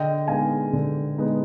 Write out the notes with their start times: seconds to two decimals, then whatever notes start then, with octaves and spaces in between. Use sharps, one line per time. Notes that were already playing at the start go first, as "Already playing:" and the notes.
Already playing: D3 D#5 G5
0.28 G#3 B3 D#4 F5 G#5
0.73 D3
1.18 G#3 B3 D#4